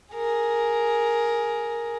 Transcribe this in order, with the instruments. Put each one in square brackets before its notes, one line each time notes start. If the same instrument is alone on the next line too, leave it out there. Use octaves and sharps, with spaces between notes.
[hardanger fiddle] G#4 A#4